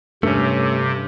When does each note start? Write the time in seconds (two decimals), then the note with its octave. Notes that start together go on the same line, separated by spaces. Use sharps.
0.23 G2 C3 A3 C#4